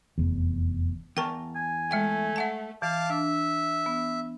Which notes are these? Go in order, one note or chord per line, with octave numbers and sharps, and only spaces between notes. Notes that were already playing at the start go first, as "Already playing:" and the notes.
F1 E2
E2 A#4 G5 A5 C#6
G#5
G#3 A3 E5 G5
E5 F#5 A5
E3 F5 A5 D6
D4 E5
B3